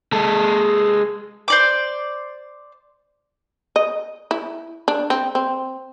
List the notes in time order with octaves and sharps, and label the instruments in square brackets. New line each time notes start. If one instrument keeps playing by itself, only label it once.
[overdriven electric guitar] G#3 A4
[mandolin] C5 D5 D6
[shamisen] D#5
E4
D4
C4
C4